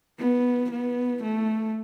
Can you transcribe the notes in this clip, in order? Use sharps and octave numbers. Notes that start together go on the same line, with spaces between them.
B3
B3
A3